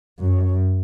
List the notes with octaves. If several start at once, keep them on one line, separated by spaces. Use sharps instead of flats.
F#2